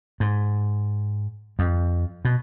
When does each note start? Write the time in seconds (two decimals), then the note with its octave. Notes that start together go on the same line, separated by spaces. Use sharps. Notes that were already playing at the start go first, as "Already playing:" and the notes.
0.20 G#2
1.59 F2
2.25 B2